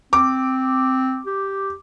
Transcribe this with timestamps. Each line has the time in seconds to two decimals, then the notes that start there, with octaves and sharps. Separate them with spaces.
0.13 C4 D6
1.26 G4